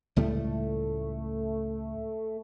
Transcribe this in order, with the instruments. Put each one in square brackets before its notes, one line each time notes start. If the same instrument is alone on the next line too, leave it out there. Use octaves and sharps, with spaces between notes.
[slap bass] C#2 A2 G3 [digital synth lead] A3